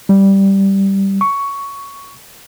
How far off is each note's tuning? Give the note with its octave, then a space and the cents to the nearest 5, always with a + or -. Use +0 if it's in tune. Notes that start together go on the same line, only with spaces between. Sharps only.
G3 -5
C#6 +10